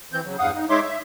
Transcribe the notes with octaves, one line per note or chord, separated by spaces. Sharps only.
E3 C4 G6
C#3 F#3
E2 G2 F5 F#5 D#6
D#4
G#3 D#4 C#5 E5 C6 D6
E5